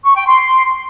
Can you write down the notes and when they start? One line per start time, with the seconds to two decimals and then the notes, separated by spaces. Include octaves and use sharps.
0.04 C#6
0.15 G5
0.26 C6